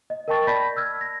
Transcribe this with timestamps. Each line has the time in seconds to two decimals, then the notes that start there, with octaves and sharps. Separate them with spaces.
0.10 D#5
0.28 A#4 D#5 G5 A5 C#6 A6
0.47 D5 A5 B5 G6 A#6 B6
0.76 E6 F6 G#6
1.01 A#6